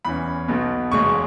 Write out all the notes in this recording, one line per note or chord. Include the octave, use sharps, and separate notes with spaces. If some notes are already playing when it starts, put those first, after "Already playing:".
E2 E3 C#4 B5
B1 B2 B3
E1 E2 C#3 G#3 C#4 C#6